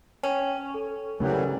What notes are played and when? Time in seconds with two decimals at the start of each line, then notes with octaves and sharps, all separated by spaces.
0.23 C#4 G5
0.74 A4
1.20 C#3 E3 F#3 G3 A3 A#4